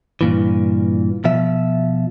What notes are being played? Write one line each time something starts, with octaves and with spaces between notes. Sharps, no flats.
G2 A#2 E3
B2 F3 E5